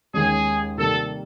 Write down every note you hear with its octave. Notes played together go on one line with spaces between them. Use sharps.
D#2 D#3 G#3 C#4 G#4
C3 D#3 G3 A#3 A4